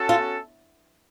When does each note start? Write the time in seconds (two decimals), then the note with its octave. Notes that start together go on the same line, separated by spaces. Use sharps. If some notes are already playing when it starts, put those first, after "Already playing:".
Already playing: C#4 F#4 A4
0.09 F4